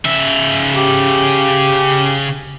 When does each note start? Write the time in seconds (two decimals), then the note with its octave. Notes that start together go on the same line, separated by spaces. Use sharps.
0.05 C#3 E5
0.75 G4